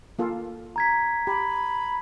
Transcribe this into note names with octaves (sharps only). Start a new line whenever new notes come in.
A#3 F4 A4
A#5 G#6 B6
G4 B5